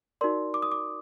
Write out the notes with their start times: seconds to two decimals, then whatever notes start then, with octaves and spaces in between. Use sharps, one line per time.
0.21 D#4 F#4 A#4 D5 C6
0.54 D6
0.62 D#6
0.72 D6